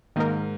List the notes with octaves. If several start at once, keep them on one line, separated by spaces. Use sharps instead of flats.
G#2 D#3 A#3 D#4 A#4